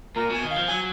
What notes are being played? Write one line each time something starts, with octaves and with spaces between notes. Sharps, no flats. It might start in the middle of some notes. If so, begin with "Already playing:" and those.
A#2 A#4
B2 G#5
D#3
F5
F3
F#3 G#5